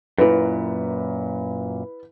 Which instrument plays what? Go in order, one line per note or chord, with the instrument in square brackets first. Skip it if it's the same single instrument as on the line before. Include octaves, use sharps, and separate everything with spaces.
[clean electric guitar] F#2 A#2 [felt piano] E4 B4